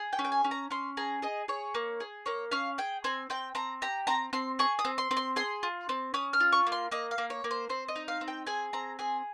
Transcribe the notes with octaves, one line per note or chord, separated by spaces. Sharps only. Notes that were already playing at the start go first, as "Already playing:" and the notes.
Already playing: G#4
G5
C#4
G5
G#5
C#4
A#5
C#4 C6
G#4 A#5
G#4 D#5
G#4 C#5
A#3
G#4
A#3 C#5
C#4 F5
G#4 G5
C4 G#5
C4 G5
C4 A#5
G4 A#5
C4 A#5
C4 C6
G#4 C#6
D#6
C4
C6
C4
C6
G#4 C6
F4
C4
C#4 D#6
F6
F4
C#6
A#3
C6
A#3 D#5
F5
A#3
C#5
A#3
C5
C4 C5
D#5
D#4
F5
C4
G5
G#4 G#5
C4 A#5
G#4 G#5